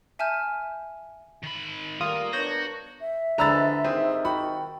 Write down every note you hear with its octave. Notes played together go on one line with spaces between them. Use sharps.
E5 G#5 A5 F6 G6
D#3 B5
G3 A3 A#3 F4 A#4 D#6
B3 D4 F#4 A#4 C#5 G6 A#6
E5
D3 E3 F3 G#3 A#5 B5 E6 A6
G#2 C3 D#3 C4 G#4 B4
F#4 G5 B5